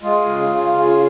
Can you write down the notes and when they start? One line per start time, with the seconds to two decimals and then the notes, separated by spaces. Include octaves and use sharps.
0.02 G#3 F4
0.26 C#3
0.49 C#3
0.73 C#3
0.85 F4